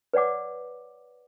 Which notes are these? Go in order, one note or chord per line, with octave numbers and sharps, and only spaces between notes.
B4 C#5 D5 F#5 D6